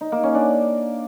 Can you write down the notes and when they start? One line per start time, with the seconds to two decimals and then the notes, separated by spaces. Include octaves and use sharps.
0.01 D#4
0.12 A#3
0.23 C#4
0.35 D4